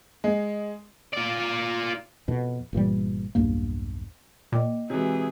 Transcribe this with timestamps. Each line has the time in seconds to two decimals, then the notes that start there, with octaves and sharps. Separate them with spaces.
0.24 G#3
1.13 F4 D5
2.28 F2 B2
2.73 G1 A#2 E3 G3
3.35 B1 E2 G2 A#3
4.52 A#2 D#5 G5 D6
4.90 C3 E3 G#3 F#4 G#4 C#5